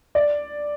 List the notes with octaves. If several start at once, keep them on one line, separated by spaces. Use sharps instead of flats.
D5